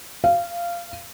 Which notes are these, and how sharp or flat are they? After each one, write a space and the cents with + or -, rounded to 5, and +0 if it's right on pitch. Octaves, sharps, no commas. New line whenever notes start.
F5 -15